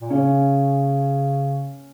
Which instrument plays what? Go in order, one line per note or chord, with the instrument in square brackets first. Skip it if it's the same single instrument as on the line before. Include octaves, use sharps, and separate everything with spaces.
[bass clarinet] A#2
[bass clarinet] C#3 [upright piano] C#4